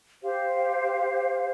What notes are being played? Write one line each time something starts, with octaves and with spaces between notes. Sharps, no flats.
G4 C5 F5